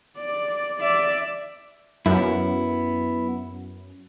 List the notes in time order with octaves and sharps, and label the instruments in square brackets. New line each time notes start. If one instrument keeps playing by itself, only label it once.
[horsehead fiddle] D5
D5 E5
[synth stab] F#2 [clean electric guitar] B3 E4